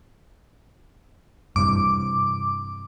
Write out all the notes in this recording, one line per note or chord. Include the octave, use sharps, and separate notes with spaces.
G2 C3 E3 D6